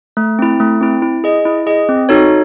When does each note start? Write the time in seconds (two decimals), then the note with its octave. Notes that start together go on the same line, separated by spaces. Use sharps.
0.17 A3
0.39 C4 E4
0.60 A3
0.81 C4 E4
1.02 E4
1.24 G#4 D#5
1.45 E4
1.67 G#4 D#5
1.89 C4
2.09 D#4 F#4 A4 C#5